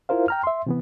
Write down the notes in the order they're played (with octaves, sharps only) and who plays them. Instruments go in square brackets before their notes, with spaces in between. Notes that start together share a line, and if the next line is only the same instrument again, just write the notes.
[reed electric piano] E4 F4 A#4 C5 F5
G5 A#5 F6
E5 C6
C3 E3 B3